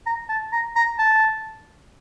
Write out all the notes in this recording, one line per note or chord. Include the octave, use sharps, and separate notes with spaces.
A#5
A5
A#5
A#5
A5